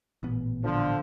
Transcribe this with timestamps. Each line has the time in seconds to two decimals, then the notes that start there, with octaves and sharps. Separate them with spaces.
0.23 A1 A#2 B3
0.63 D3 F3